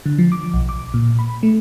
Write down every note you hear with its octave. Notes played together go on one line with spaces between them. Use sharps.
D3
F3
D6
B1
D6
A#2
B5
A3